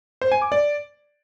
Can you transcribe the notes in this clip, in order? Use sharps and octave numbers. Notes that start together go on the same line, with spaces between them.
C5
G#5
D6
D5